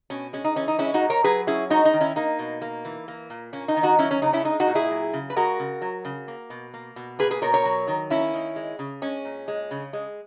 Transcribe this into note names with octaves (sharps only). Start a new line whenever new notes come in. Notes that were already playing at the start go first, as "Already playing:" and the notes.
B2 C#4
G#3 C#4
D#4
E3 C#4
D#4
G#3 C#4 E4
D#4 F#4
A#2
A#4 C#5
F#3 G#4 B4
C#4 E4 G#4
G#3 D#4 F#4
D#4
D#3
C#4 E4
A#3 D#4
B2
A#3
E3
A#3
A#2
A#3 C#4
D#4
D#3
D#4 F#4
F#3 C#4 E4
C#4
C#3 D#4
C#4 E4
G#3 D#4
D#4 F#4
A#2
E4 G#4
F#3
C#3
B4
G#3 F#4 A#4
C#3
F#3
C#3
A#3
B2
A#3
B2
A#3 G#4 B4
G#4 B4
B2 A#4 C#5
A#4 C#5
F#3
D#3
A#3 C#4 E4
D#3
G#3
C#3
G#3 C#4
A#2
G#3
C#3
G#3